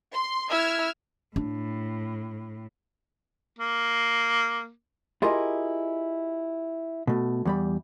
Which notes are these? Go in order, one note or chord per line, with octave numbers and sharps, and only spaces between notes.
C6
E4 E6 F6 G#6
A2 D4
A#3
E4 F4 G4 G#4 A#4 D#5
B2 A3
E2 G3 B5